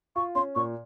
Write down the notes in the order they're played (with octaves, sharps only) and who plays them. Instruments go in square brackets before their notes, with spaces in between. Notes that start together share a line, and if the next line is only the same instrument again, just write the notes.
[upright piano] F4 [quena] C#6
[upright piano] C#4 [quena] C6
[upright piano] A#2 [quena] C#6